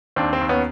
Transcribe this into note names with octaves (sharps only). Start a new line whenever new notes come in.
D#2 C4 D4
C4
D#2
B3 C#4